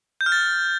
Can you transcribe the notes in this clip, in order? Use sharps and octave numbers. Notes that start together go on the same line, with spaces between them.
G6
F6
A6